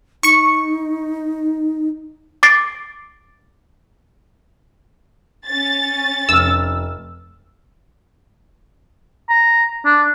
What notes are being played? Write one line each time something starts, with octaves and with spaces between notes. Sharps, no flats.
D#4 C#6 C#7
D6 A6 C7 D7
C#4 A6
F1 E6 F6
A#5
D4